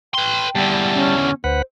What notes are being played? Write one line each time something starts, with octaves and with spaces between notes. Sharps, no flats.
B4 G5 C6
E2 D3 G3 A5
C#4
D2 B4 C5 F#5